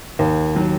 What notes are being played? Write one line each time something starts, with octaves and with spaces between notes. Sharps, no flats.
D#2
D#3 F#3